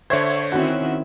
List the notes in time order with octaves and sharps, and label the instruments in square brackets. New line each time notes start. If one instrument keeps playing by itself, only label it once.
[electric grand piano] D3 C5 [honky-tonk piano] C#5 E5 G#6
[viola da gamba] D#3 C4 E4 [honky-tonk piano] C#4 F#4